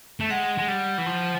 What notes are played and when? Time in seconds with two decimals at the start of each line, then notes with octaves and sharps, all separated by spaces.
0.20 A3
0.30 G#3 F#5
0.58 G#3
0.68 G3
0.98 E3
1.06 F3